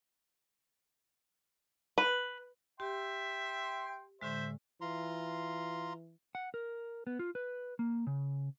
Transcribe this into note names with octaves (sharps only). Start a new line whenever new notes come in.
B4
G4 E5 G5 C6
A2 D3 G#3 C5 E5
E3 F4 A#5 C6
F#5
A#4
B3
F4
B4
A#3
C#3